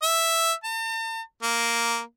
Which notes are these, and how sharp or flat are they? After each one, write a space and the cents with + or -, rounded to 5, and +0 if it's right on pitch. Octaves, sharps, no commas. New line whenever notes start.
E5 +0
A5 +45
A#3 +0